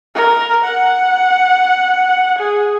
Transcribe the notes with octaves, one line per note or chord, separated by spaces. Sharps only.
A#4
F#5
G#4